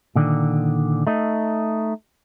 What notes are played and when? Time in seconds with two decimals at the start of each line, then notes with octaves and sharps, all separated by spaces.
0.16 A#2 D3 D#3
1.07 A3 D#4